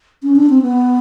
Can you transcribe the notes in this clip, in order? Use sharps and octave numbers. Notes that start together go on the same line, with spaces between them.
C#4
D4
C4
B3